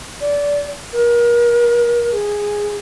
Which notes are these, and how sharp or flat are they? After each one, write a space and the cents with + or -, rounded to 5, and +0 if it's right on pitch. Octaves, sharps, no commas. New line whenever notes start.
D5 -25
A#4 +35
G#4 -10